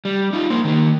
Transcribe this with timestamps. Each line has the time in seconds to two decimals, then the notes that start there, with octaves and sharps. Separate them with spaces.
0.05 G3
0.33 D#4 F4
0.50 A#3 C5
0.65 D#3 A#3